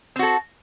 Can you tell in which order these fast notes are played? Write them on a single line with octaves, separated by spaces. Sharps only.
C4 F#4 A4